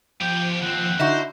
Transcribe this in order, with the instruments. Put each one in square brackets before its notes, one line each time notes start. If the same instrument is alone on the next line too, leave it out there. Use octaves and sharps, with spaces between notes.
[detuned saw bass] F3 [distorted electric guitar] B3 G4 [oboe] G5
[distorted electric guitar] D#2 C4 [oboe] F#5
[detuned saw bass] D3 [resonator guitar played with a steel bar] D#4 E4 F#4 [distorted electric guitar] C5